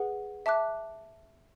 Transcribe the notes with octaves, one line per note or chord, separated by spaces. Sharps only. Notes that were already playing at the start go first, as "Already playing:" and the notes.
Already playing: G#4 B4 F#5
E5 A5 D6 F#6